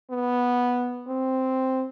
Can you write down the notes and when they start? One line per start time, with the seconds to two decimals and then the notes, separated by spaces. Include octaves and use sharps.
0.11 B3
1.08 C4